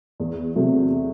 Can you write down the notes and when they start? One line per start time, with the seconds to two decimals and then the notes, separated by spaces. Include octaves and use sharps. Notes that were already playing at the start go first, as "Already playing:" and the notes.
0.20 E2
0.55 C3 F#3 A3